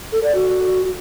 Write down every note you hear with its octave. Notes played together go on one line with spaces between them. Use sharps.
A4
D5
F#4